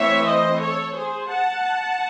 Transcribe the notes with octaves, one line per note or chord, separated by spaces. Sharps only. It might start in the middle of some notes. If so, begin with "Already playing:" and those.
Already playing: E3 A3 C4 C#5 E5
C5 D#5
A4 C#5
G#4 C5
F#5 A5